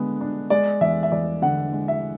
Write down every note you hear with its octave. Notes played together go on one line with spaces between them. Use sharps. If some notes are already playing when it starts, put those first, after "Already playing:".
Already playing: D3 G#3 B3
D4
G#3 D5
E2 E5
E5
E2 D5
D3 F#5
G#3
E5